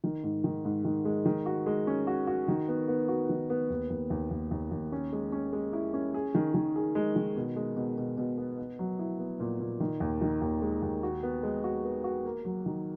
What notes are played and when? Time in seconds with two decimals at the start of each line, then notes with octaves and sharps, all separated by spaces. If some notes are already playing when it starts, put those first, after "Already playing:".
0.04 D#3
0.23 G#2
0.44 D#3
0.65 G#2
0.85 D#3
1.05 G#3
1.26 D#3
1.46 F#4
1.66 G#3
1.87 C#4
2.07 F#4
2.27 F#4
2.48 D#3
2.68 B3
2.88 B3
3.08 F#4
3.29 D#3
3.50 B3
3.70 D#2
3.90 D#2
4.10 D#2
4.31 D#2
4.51 D#2
4.71 D#2
4.92 C#4
5.12 G#3
5.32 C#4
5.53 G#3
5.73 E4
5.94 C#4
6.14 G#4
6.35 D#3
6.54 D#3
6.76 G#4
6.95 G#3
7.16 D#3
7.36 B2
7.56 G#3
7.77 B2
7.98 B2
8.17 B2
8.38 B3
8.58 B3
8.79 F#3
8.99 E4
9.19 B3
9.40 A#2
9.60 A#2
9.80 D#3
10.00 D#2
10.22 D#3
10.42 D#2
10.62 G#3
10.82 D#2
11.03 F#4
11.23 B3
11.43 G#3
11.64 F#4
11.84 B3
12.04 F#4
12.24 A#3
12.45 F#3
12.66 D#3